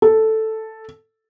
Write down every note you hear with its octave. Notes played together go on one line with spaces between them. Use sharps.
A4